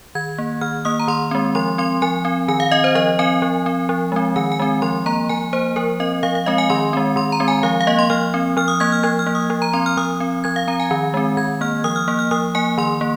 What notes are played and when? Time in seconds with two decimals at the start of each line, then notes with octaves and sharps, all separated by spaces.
0.15 D#3 G#6
0.38 A#3
0.61 D#3 F6
0.85 A#3 D#6
1.00 A#5
1.08 D#3 C6
1.31 G#3 C4
1.55 F3 C6
1.78 C4 C6
2.02 F3 G#5
2.25 C4
2.48 D#3 G#5
2.60 F5
2.71 C4 D#5
2.84 C5
2.95 F3 D#5
3.19 C4 G#5
3.42 F3
3.66 C4
3.89 F3
4.12 G#3 C4
4.36 D#3 G#5
4.52 G#5
4.59 G#3 C4
4.82 F3 C6
5.06 A#3 A#5
5.29 F3 G#5
5.53 A#3 C5
5.76 F3 A#4
6.00 C4 D#5
6.23 F3 F5
6.35 F5
6.46 G#3 C4 D#5
6.58 G#5
6.70 D#3 C6
6.93 G#3 C4
7.16 D#3 C6
7.32 A#5
7.40 G#3 C4
7.48 G#5
7.63 F3 F5
7.81 F5
7.87 A#3 D#5
7.99 C6
8.10 F3 F6
8.34 C4
8.57 F3 F6
8.68 D#6
8.80 A#3 G#6
8.92 F6
9.03 F3 G#6
9.19 F6
9.26 A#3
9.35 D#6
9.50 F3
9.62 A#5
9.73 C4 C6
9.86 F6
9.97 F3 D#6
10.20 C4
10.44 F3 G#6
10.56 F5
10.68 C4 A#5
10.80 G#5
10.91 D#3
11.14 G#3 C4
11.37 D#3 G#6
11.61 A#3 F6
11.84 F3 D#6
11.96 F6
12.08 A#3 F6
12.19 F6
12.31 F3 D#6
12.55 A#3 G#5
12.78 D#3 C6
13.01 A#3